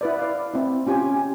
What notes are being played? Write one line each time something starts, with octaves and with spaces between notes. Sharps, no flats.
E4 B4 D5
D5 F5
C4 E4
C#4 F4 G4 G#5